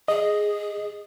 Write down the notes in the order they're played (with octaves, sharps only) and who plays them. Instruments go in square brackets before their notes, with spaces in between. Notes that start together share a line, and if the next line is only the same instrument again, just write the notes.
[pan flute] G#4 [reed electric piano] D#5